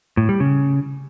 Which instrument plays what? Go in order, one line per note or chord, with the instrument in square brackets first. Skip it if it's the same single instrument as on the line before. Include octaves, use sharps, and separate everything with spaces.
[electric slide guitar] A2
G3
C#3